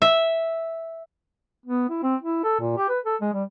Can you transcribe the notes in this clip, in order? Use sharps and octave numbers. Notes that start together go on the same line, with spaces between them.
E5
B3
E4
C4
E4
A4
A#2
G4
B4
A4
G#3
G3